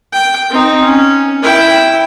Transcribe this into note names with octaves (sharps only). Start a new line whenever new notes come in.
G5
C4 D#4
C#4
E4 G5